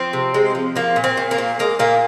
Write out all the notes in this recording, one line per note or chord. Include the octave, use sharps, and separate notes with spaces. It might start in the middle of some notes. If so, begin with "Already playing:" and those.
Already playing: F3 C4
C3
G#3
F3
F3 A#3
A#2
C4
A#2
A#3
A#2
G#3 A#3
A#2 A#3